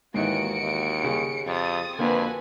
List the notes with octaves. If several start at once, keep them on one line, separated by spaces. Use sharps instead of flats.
D#2 G#2 D#3 E3 F#4 C#7 D7
D#2
C#3 G3
F2 D#6 A6
F2 D3 A#3 F#4 B4 G#5